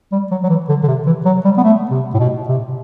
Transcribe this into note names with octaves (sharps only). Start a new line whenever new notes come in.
G3
F#3
F#3
E3
D3
D3
C3
E3
F#3
G3
B3
A3
C3
A2
B2
C3